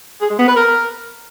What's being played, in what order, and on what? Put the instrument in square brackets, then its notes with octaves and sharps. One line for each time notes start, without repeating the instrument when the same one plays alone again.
[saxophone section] G#4
G#3
B3
B4
A#4